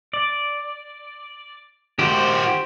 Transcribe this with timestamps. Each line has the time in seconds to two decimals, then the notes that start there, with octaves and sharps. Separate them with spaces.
0.14 D5
1.99 D#3 F#4 G4 C5